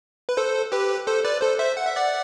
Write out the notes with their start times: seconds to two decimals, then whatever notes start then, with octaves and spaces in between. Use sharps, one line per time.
0.29 B4
0.37 A4 C5
0.72 G4 B4
1.07 A4 C5
1.24 B4 D5
1.42 A4 C5
1.59 C5 E5
1.77 F#5
1.87 E5
1.96 D5 F#5